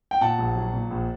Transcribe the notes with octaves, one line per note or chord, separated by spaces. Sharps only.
G5
A#2 F#5 A5
A#1
F#3
A#2
A#1